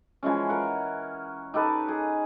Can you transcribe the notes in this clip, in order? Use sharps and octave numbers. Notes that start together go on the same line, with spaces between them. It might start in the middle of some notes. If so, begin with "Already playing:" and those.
E3 F3 G#3 C#4
A#4 F#5
D#4 G4 A4 B4
G#4